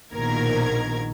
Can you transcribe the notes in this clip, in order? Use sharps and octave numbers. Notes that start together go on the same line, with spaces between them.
A#1 B2 D#3 A#4 G#6